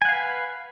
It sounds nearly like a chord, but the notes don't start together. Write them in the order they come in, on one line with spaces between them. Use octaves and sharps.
G#5 F#5 F5 B4